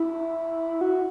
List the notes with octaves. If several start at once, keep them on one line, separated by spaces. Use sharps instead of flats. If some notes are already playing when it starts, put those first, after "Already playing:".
Already playing: E4
F#4